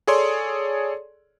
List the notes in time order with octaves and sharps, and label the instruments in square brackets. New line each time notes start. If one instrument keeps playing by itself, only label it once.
[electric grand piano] G#4 A4 C#5 D5 C6